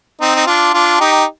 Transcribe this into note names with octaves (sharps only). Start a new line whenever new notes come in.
C4 D#4
D#4
D4 F4
D4 F4
D#4 G4